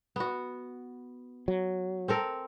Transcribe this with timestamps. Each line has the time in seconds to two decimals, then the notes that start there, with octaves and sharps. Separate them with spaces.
0.16 B3 F#4
1.48 F#3
2.08 C4 A4 A#4